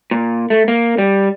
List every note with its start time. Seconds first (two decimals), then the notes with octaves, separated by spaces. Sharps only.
0.11 A#2
0.50 A3
0.68 A#3
0.98 G3